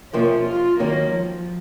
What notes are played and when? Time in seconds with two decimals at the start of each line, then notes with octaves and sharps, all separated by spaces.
0.13 F2 C3 F3 A#3 C#4 F4
0.47 F4
0.80 D#2 D#3 F#3 A#3 C#4
1.13 F3